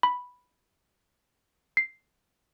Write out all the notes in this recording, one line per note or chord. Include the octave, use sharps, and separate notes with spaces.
B5
C7